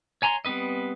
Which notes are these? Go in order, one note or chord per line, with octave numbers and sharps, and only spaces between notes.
C#5 G#5 A#5 C6
G3 B3 C4 B4 D#5